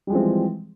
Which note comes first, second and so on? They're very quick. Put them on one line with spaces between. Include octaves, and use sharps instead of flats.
G3 G#3 F3 C4 E3